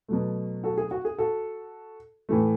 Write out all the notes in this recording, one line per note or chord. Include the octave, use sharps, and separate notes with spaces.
B2 F#3 A3
F#4 A4
G#4
F#4
G#4
F#4 A4
A2 E3 A3